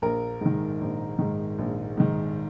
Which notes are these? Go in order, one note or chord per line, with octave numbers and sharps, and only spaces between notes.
A#1 A#4
G#2 D#3
A#1
G#2 D#3
A#1
G#2 D#3